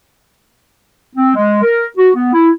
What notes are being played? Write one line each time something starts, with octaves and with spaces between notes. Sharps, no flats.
C4
G#3
A#4
F#4
B3
E4